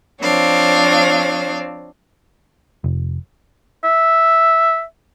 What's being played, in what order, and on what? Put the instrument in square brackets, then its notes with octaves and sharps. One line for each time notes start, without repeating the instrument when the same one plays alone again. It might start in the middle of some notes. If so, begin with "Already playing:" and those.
[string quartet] F3 C4 D4 C#5 F5
[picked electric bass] F1
[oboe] E5